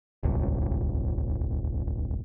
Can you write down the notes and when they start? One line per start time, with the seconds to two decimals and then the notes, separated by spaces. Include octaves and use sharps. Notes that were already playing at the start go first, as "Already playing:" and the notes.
0.23 D#1 G#1 C#2